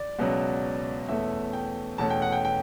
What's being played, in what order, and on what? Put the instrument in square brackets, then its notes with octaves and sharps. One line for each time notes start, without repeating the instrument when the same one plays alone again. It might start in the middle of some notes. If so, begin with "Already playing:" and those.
Already playing: [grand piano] D5
C#2 B2 F#3
E2 B2 A3 C#4 E5
G5
E2 B2 A3 C#4 A5
G5
F#5
G5
G5